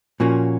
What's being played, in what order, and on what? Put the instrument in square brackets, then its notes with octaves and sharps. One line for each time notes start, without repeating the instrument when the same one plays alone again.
[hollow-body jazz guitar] A#2 F3 A#3 C#4 F#4